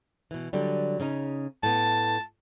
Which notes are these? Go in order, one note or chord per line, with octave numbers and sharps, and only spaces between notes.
B2 E3
D3 F#3 G3
C#3 C#4 D#4
A2 B3 A5